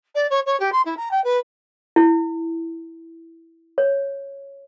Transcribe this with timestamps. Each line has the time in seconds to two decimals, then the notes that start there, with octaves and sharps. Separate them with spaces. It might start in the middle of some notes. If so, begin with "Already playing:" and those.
0.15 D5
0.30 C#5
0.46 C#5
0.60 G4
0.72 C6
0.85 E4
0.97 A#5
1.11 G5
1.24 B4
1.96 E4
3.78 C#5